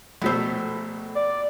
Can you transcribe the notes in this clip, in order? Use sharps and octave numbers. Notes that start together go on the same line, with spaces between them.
A#1 B2 A3 C5 E6
D5